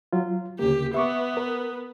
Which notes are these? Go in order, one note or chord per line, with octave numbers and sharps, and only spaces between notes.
F#3 F4
D2 C#3 A#3 G4
B3 E5 C#6 D6
A#4